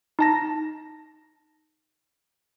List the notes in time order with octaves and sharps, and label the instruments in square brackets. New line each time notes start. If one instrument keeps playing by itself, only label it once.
[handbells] D#4 A5 A#6